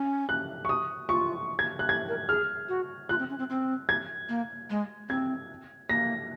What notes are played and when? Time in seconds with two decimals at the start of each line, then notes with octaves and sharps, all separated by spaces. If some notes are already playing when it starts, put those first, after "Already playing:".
Already playing: C#4
0.29 F#6
0.65 C#6
0.69 D#6
1.09 F4 C#6
1.59 G#6
1.79 F#6
1.89 G#6
2.09 A#4
2.29 G#4 F6
2.69 F#4
3.09 F4 F#6
3.19 C4
3.30 C#4
3.39 C4
3.50 C4
3.89 G#6
4.29 A#3
4.70 G#3
5.09 C4 G#6
5.89 A#3 A#6